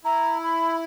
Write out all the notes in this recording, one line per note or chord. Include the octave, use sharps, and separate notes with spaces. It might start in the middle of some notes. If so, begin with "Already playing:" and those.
E4 A#5
B5